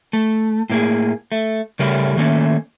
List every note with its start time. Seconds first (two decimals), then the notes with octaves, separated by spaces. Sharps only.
0.13 A3
0.70 A2 A#3 G#4
1.32 A3
1.79 C#3 G3 A3 A#4
2.17 D#3 A3 A#3 C#4